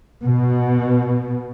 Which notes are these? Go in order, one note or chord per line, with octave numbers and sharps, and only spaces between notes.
B2